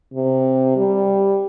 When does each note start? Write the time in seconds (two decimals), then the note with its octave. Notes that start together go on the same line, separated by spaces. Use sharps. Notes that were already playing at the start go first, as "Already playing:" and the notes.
0.14 C3
0.77 G3